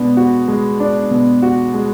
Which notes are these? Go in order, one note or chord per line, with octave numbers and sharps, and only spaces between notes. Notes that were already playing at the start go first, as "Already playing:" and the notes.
Already playing: B2 G#3 D4
F#4
G#3
D4
B2
F#4
G#3